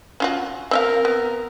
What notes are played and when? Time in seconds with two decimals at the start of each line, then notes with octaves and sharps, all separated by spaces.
0.20 C#4 F4 F#4
0.71 C4 A#4 D#5 F5
1.05 B3